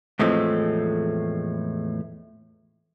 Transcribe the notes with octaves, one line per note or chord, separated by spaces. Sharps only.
E2 A2 F3 G#3 A3 C4